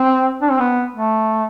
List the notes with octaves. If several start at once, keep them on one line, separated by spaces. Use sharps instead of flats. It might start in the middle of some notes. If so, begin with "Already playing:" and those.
Already playing: C4
D4
C4
B3
A3